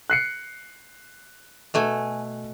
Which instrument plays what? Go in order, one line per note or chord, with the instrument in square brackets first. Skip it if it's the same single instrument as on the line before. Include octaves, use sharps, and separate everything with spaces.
[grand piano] F#6 C7 C#7
[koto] B2 A3 G#5